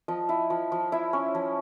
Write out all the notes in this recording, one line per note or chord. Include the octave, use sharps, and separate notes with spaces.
F3 D#5
E4
F3
F3
E4 E5
C#4
F3